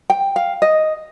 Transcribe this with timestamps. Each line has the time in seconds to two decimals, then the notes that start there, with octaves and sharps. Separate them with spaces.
0.10 G5
0.36 F5
0.62 D#5